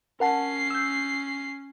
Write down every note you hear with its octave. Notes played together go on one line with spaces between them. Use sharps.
C#4 A#4 F#5 A5 C7
E6 G6